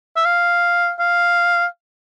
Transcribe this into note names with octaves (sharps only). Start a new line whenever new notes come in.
E5
F5
F5